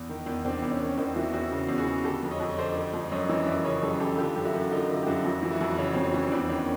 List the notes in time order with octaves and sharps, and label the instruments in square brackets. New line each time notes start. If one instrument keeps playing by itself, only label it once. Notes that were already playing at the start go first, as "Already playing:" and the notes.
Already playing: [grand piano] E2
D#3
E2
C3 C4 D4
E2
C#4
D#3
E2 C4
E3 E4 F#4
E2 E4 F#4
C#3
E2
F#4 G#4
E3
D3 G4 A4
F2
C#5 D#5
F2
D#5
D3 C5 D5
D3
F2
F#2 C#5 D#5
E3 C#5 D#5
F#2 D5 E5
C#3 C#5 D#5
F#2 G4 A4
E3 G4 A4
D3 F4 G4
F#2 G4
E4 F#4
F#2
D3 D#4 F4
D3 D4 E4
G4
F#2 E4 F#4
F2 E4 F#4
E3
E4 F#4
F2
C#3 C#4
F2 C4
C#4
E3
E2 C4 D4
D#3 C#4